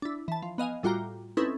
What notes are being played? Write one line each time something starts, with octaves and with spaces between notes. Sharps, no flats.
D4 E4
E3 A5
F3
B3 D#5 F5 G#5
A2 G3 F4 F#4 G5 A#5
C4 C#4 D#4 E4 A4 B4